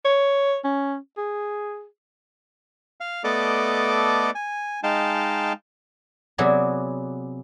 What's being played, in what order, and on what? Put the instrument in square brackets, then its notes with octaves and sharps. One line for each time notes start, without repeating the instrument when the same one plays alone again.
[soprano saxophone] C#5
C#4
G#4
[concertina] F5
A3 B3 A4 D5 D#5 D6
G#5
G#3 D#4 F5 G5 A5
[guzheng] C3 F#3 B3 G#4 D5